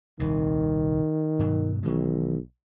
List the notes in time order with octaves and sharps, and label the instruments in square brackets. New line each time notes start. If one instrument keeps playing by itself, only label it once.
[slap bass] D#1 C2 C3 [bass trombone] D#3
[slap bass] G2 B2 F#3
[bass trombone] B1 [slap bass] D#3 E3 G#3